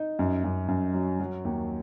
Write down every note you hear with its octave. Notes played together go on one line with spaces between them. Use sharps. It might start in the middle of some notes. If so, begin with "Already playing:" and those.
Already playing: D#4
F#2
F#2
F#2
F#3
F#3
D#2